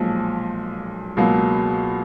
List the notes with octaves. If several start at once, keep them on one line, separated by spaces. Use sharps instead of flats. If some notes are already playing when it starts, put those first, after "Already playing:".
Already playing: B1 A#2 F3 G#3
C#2 B2 F#3 A#3